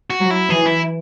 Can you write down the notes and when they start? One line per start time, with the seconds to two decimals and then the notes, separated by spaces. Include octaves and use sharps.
0.10 F#4
0.20 F#3
0.31 E4
0.50 E3 G#4
0.66 E4